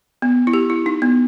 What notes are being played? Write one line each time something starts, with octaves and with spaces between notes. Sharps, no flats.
B3
E4
G4
E4
D#4
B3